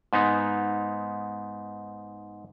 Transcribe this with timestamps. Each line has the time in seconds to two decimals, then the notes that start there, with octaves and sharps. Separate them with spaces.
0.13 G#2 B3 D#4